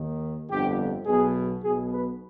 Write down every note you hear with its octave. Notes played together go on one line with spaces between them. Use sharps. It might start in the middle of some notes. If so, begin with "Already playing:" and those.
Already playing: D#2 D#3
G1 F2 D3 G4
B1 B2 G#4
B1 B2 G#4
B4